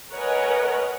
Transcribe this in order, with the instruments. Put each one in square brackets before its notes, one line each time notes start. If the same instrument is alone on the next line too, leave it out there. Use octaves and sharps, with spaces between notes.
[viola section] A#4 B4 C#5 D#5 F#5 G#5